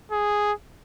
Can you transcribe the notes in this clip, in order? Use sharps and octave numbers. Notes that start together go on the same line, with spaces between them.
G#4